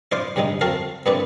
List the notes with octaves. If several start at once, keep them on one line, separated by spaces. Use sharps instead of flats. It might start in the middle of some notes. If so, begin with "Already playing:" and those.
E4 C5 D5 F5 D6
G2 C#3 G3 G#3 D#4
C4 F4 F#4 A4 A#4 F5
G2 A#3 C4 E4 B4 D5